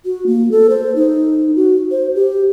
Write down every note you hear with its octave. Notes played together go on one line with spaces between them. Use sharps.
F#4
A#3
A4
C5
D#4
F#4
C5
G4